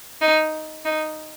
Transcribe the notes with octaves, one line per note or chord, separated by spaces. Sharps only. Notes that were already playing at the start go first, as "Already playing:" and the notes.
D#4
D#4